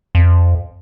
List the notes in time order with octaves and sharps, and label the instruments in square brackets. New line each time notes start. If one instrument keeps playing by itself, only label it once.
[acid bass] F2